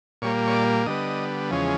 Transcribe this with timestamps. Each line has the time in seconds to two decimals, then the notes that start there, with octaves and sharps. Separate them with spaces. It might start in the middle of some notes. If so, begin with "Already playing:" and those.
0.22 A#2 G3 A#3 C#5
0.47 C#5
0.54 D5
0.86 D3 G3 B3 D#5
1.51 E2 C#3 F3 G#3 C#4